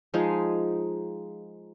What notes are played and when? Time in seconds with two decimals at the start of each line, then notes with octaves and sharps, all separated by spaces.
0.14 F3 G#3 D#4 G#4